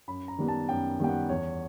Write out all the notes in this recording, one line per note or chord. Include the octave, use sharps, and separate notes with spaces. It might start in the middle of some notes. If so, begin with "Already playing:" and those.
F#2 B5
A#5
D#3 G3 B3
A5
F#2 G5
D#3 G3 B3 G5
F#5
E2 C#5